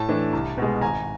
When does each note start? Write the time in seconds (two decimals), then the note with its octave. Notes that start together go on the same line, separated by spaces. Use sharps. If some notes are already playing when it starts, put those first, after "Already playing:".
Already playing: A2 A5
0.09 E3 A3 D4
0.33 C2
0.58 B2 G#3
0.81 G#1 G#5 A#5